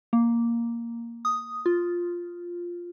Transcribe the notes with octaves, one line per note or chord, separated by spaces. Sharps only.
A#3
D#6
F4